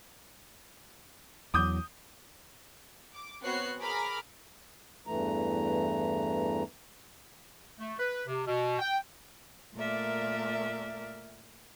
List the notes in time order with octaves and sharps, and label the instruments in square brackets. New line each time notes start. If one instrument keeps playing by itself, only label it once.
[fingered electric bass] E2 F#3 [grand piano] D6 D#6 G6
[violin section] D6
B3 C4 F#4 C#5 F#6 C7
G#4 A#4 A#5 B5 D6 F6
[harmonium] E2 G2 E3 A3 A#5
[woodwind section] A3
B4
C3
B2
G5
[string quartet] A#2 A3 A#4 D5 E5